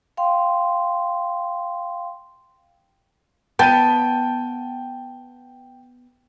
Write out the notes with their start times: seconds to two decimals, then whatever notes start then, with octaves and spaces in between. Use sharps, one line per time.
0.17 F5 G5 C6
3.59 B3 G5 A5 G6 D#7